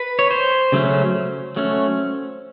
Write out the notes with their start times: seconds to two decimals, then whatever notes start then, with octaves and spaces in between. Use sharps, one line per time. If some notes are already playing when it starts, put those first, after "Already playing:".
Already playing: B4
0.19 C#5
0.31 C5
0.72 C#3 F#3 A3 C#4
1.56 F#3 A3 C#4